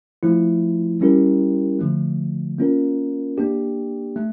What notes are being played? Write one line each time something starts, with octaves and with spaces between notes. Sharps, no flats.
F3 A3 E4
G3 C#4 E4 G4 A#4
D3 F3 A3
A#3 C#4 F4 A#4
A#3 D4 G4
A3